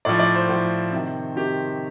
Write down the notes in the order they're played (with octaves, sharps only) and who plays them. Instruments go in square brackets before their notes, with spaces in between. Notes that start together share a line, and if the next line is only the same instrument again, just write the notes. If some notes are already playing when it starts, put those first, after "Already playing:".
[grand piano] A2 F3 D5
D5
C5
A2 F3
C3 D#3
C3 D#3 G4